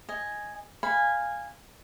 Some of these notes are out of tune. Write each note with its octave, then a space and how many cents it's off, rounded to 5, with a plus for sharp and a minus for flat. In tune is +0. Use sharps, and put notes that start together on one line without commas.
D#5 +0 G#5 +0
F5 +0 G#5 -15 B5 +0